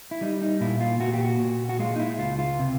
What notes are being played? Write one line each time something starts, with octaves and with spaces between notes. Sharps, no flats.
E4
G3 D#4
D#4
A#2 E4
F4
A#2 F#4
G4
F#4
A#2
F#4
G#3 F4
D#4
E4
C#2 F4
F4
C3